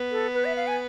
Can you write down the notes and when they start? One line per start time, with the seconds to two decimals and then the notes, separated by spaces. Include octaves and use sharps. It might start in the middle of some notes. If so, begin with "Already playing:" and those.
Already playing: B3
0.12 A4
0.34 B4
0.45 E5
0.57 F5
0.67 G#5